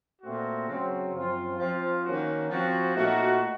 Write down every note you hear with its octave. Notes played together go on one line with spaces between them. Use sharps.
A#2 A3 C4 F#4
C#3 F#3 C4
F#2 F3 C4 F4
F3 C4 F4
D#3 A#3 C#4 F#4
F3 C4 F#4
A#2 A3 D#4 F#4